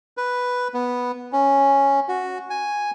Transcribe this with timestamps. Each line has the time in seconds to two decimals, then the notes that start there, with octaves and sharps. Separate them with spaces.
0.17 B4
0.74 B3
1.32 C#4
2.08 F#4
2.50 G#5